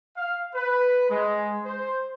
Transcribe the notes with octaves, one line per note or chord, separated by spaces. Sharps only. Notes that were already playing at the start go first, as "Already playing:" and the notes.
F5
B4
G#3
C5